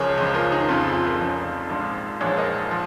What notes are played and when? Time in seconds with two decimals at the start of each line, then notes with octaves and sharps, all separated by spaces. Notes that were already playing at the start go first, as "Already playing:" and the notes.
Already playing: C#2 C#3 F3 G#4 A#4 C#5
0.17 C#2 C#3 F3
0.34 F4 A#4
0.52 D#4 G#4
0.68 F1 F2 C#3 F3 F4
0.81 F4
0.88 G#4
0.94 F4
1.06 F4 A#4
1.19 F1 F2 C#3 F3
1.70 A#1 G#2 F3
2.20 A#1 G#2 F3 G#4 C#5
2.37 A#4 D#5
2.71 F3